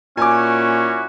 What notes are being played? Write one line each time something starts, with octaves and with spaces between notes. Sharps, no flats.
A#2 C#4 E4 F#4 G#5 D6